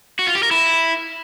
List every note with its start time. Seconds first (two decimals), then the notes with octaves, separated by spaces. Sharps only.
0.19 F#4
0.27 F4
0.35 G4
0.43 A#4
0.51 E4